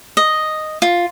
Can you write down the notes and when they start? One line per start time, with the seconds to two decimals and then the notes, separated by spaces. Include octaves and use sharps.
0.17 D#5
0.82 F4